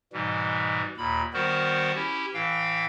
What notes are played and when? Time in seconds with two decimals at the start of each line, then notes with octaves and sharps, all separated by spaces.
0.13 G#2 B2 E3 G3
0.98 D#2 A#2 B5
1.34 D#3 G3 B3 F#4 A#4 C5
1.95 C#4 E4 G4
2.34 A2 E3 F5 G5